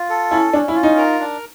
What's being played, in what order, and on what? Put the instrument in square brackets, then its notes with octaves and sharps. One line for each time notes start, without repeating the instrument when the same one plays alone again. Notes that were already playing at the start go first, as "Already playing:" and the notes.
Already playing: [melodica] F4
A4
[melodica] C#4 [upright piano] E4
[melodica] C#4 [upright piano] D4
[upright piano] E4
[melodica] F4
[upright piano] D#4
[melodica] A#4
D4